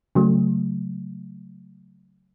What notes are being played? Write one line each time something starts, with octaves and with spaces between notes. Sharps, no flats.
C#3 F#3 A3